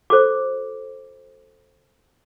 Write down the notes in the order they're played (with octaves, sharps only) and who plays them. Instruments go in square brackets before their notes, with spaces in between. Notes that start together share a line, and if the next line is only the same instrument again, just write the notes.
[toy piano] F#4 A4 C5 D6